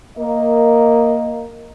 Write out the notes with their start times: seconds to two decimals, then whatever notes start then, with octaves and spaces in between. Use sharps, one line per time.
0.18 A#3 D#5